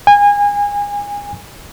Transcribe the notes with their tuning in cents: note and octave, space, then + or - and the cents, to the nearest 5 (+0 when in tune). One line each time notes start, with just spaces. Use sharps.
G#5 -25